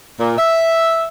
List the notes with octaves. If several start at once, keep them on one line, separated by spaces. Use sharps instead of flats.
A#2
E5